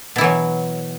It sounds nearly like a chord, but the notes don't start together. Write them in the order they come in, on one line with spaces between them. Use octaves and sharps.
B2 E4 E3 F#3